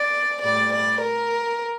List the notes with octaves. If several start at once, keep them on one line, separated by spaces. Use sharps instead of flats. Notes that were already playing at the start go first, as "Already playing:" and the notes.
Already playing: D5
A2 G3 D5
D5
A#4